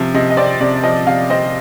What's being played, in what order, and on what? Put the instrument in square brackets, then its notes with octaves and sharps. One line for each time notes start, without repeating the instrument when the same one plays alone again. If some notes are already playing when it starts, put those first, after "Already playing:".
Already playing: [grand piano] C3 F3
[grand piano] C3 [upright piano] D#5
[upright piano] D#5
[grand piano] C4 [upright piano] D5
[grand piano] C3 [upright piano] D5
[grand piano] F3 [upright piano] D#5
[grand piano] C3 [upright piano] F5
[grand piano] C4 [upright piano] D#5